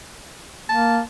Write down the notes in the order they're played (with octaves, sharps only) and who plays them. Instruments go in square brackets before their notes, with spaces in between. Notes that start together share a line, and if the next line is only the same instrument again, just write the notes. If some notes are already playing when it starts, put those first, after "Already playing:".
[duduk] A#3 [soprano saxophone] A5